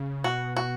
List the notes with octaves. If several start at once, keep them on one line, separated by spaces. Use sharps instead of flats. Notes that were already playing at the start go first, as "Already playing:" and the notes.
Already playing: C#3
B2 F#4
F#4